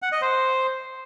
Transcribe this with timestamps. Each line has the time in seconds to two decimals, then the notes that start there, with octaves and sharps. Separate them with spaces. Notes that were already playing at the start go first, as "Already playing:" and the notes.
0.02 F#5
0.12 D#5
0.22 C5